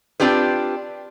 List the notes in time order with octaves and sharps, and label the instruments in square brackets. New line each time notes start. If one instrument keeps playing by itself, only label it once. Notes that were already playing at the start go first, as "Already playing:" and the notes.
[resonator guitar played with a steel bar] C4 D4 F4 G4 B4